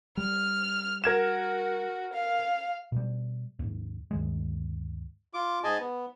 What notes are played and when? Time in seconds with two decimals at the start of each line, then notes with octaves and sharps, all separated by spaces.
0.17 G3 F6
1.04 F#4 A#4 G#6 E7
2.13 F5
2.92 B2 G3
3.59 D#2 G#2
4.11 D2 G2 D#3 G#3
5.34 F4 D6
5.64 G#2 G#4 D#5 G#5 A5
5.79 B3